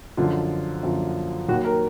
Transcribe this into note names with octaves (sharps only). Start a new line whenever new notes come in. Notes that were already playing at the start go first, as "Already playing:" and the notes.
F#2 D3 F3 F4
F#2 D3 F3
D#2 D#3 F#3 F#4
A#4